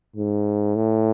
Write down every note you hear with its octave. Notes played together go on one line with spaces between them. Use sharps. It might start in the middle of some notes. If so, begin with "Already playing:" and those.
G#2
A2